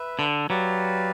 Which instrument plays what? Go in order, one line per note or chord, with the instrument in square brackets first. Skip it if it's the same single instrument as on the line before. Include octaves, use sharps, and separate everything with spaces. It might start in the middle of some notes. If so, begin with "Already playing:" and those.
Already playing: [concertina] B4 E5
[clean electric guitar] D3
[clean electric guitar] F#3 [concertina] G4 B4 D5 F5